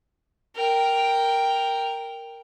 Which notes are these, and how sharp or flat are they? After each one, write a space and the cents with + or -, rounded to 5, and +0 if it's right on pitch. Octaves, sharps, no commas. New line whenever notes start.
A#4 +0 G5 +0